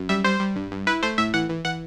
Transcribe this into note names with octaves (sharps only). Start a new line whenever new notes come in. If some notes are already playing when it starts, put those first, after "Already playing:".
Already playing: F#2
G3 E5
G3 C5
G3
G2
G2
E4 B4
A3 C5
A2 E5
E3 F#5
E3
E3 F#5